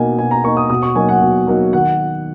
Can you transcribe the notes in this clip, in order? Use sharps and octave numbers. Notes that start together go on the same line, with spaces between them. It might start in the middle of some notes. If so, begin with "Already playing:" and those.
Already playing: B2 A#3 D#4 G#5
B2 G#5
A#5
A#3 D#4 C#6
D#6
B2 D#6
C#6
F#3 A#3 D#4 G#5
F#5
B2
F#3 A#3 D#4
D#3 F#5